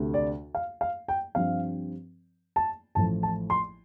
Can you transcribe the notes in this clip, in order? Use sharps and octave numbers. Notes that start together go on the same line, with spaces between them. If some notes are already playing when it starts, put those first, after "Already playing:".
Already playing: D2 C3 A3
D5
F5
F5
G5
G2 F3 C4 F5
A5
A1 A2 F3 A3 A5
A5
C6